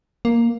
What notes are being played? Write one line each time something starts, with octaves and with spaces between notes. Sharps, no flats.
A#3